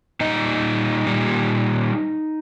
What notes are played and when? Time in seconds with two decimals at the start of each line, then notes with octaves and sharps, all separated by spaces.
0.20 A#2 G3 D#4 D#5
1.07 A#2 G3